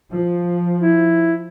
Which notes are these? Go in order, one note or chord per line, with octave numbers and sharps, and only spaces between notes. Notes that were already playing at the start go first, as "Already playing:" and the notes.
F3
E4